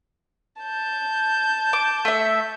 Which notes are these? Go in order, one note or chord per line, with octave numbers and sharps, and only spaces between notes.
A5 G6
D6
A3 E5